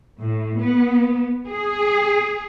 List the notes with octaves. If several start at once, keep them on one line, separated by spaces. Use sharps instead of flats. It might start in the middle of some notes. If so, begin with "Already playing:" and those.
A2
B3
G#4